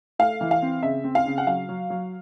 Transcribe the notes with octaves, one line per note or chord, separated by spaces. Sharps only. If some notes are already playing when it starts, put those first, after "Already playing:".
A3 F5
E3
F5
C4
C#3 E5
C4
F5
C#3
F#5
F#3 F5
F#3
F#3